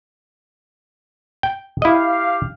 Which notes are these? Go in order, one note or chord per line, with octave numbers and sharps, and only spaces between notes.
G5
E4 G4 D#5 F5